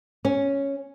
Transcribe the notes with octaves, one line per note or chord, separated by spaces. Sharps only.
C#4